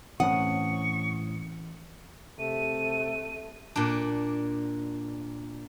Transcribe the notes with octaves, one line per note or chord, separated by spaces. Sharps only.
A2 E3 C4 C#4 F#5 C#6 D#6
C3 A3 D#7
A#2 D4